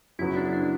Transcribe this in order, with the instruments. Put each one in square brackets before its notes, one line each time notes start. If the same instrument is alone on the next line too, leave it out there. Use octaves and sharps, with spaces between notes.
[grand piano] F#2 C#3 F#3 B3 [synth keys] E4
[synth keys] D4
D4